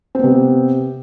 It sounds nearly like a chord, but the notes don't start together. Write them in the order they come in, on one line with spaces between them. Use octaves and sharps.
C4 B3 C3